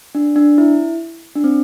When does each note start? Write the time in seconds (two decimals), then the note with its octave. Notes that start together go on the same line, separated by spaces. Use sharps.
0.15 D4
0.36 D4
0.58 E4
1.35 D4
1.44 C4